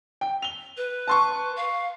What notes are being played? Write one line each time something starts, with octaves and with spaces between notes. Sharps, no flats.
G5
F7 G7
B4
A5 C6 C#6
F5